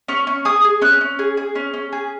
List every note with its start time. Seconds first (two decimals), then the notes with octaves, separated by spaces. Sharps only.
0.08 C#4 C#6
0.27 C#4
0.45 G#4 D#6
0.64 G#4
0.81 C#4 F#6
1.01 C#4
1.19 G#4
1.37 G#4
1.55 C#4
1.74 C#4
1.92 G#4